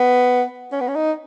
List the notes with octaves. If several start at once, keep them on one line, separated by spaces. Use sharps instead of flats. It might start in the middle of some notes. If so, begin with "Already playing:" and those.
Already playing: B3
C#4
B3
C#4
D#4